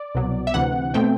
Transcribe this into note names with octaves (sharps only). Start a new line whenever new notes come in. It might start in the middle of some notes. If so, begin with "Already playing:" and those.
Already playing: D5
C2 B2 F#3
E5
D2 C3 E3 F#5
B2 A3 C4 G5